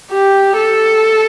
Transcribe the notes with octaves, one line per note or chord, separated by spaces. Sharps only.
G4
A4